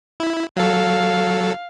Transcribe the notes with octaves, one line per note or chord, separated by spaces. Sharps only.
E4
F#3 A4 F5